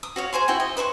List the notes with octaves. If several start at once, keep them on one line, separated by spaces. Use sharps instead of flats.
D#6
F#4 C#5 F5
G#4 C5 G#5 C6
E4 F#4 G5
D#5
B4 C5 B5 C#6